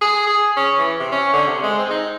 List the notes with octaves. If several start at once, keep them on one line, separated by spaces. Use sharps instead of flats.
G#4
G#4
C#4
E3
C3
C#4
D3
C3
G#3
C4
D#4